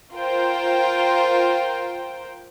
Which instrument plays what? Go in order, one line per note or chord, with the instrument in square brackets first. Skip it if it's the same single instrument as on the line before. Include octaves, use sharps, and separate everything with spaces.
[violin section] F4 A#4 C5 G5